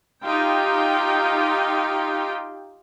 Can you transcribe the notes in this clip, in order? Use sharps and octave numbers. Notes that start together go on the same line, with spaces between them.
D#4 F4 G4 G5